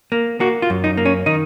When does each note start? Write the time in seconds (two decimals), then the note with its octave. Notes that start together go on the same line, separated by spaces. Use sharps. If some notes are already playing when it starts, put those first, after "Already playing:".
0.12 A#3
0.40 A#3 F#4
0.62 F4
0.70 F#2
0.84 D#4
0.97 A#3
1.05 C#4
1.26 D#3 D#4